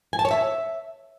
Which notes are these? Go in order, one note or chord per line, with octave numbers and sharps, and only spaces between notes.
G#5
A5
C#5
E5